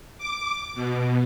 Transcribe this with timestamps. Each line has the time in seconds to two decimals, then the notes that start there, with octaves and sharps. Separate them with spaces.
0.18 D6
0.74 B2